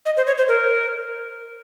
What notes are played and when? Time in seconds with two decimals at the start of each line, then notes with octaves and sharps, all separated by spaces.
0.06 D#5
0.17 C5
0.27 C#5
0.38 C5
0.48 A#4